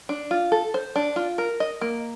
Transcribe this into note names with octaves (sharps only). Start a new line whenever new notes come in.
D4
F4
A4
C5
D4
F4
A#4
D#5
A#3